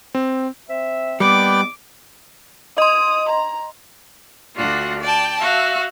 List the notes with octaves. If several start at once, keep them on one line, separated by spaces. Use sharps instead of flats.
C4
C4 E5
D#3 G3 A#3 B3 B4 D5 G5 D6
D#5 C6 D#6
A#5
D2 D4 F4 F#4 F#5
D5 G5 A5
F#4 E5 F5